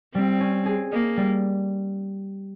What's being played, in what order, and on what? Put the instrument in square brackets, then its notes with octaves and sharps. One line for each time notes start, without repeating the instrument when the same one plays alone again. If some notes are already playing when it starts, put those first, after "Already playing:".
[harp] G3 [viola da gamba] C4
[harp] C#4
G#4
[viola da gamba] A#3 [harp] D#5
[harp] G3